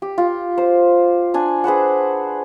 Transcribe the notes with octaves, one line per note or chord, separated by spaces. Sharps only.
G4
F4
C5
D4 G#5
G#4 B4 C5 F#5